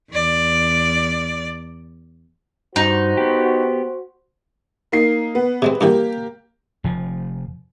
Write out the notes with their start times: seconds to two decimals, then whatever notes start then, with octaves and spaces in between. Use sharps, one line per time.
0.10 E2 D5
2.76 G2 D#4 F#4 C5
3.17 B3 G4
4.92 A#3 D#4 C7
5.35 B3
5.62 C3 G#3 C4
5.81 G2 D3 E3 A#3 G4
6.84 F1 F3